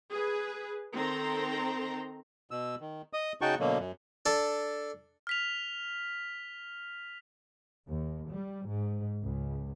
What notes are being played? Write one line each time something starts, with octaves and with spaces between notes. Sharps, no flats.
G#4 B4
D#3 C4 A4 A#5 C6
B2 E6
D#3
D#5 D#6
C#3 D#4 F#4 G5 A5 C#6
B2 D3 F#3 A#3
F#2
D4 A4
F6 B6 F7
D#2
G3
G#2
C#2